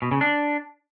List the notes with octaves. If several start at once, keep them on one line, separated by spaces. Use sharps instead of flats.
B2
C#3
D4